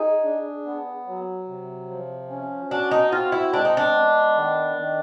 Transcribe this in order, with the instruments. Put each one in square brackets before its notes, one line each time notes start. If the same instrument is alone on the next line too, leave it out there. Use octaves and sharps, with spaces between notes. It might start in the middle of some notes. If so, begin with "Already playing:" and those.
Already playing: [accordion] D#4 [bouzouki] G#4
[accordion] D4
B3
F#3
C3
F3
C#4
[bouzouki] D4 [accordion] F#4
[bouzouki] D#4
[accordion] C4 [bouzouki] F4
[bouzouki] E4
[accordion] G#3 [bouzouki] D4
[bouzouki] D#4
D4
[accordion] B3
D#3
D#3